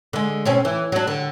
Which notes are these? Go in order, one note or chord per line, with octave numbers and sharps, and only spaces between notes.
D3 G#3
B2 C4 C#4
E3
F#3 D4
D3